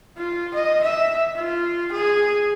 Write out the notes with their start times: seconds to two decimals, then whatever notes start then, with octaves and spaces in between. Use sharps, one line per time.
0.17 F4
0.54 D#5
0.83 E5
1.35 F4
1.92 G#4